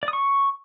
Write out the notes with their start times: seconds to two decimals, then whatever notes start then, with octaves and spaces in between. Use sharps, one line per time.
0.03 D5
0.08 D#6
0.13 C#6